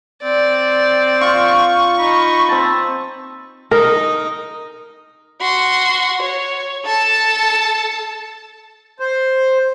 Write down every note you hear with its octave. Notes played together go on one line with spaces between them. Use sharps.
C4 D5
F4 C#6
D#4 B5
C4 A5
D#4 A#4 D#5
F#4 C6
C#5
A4 A5
C5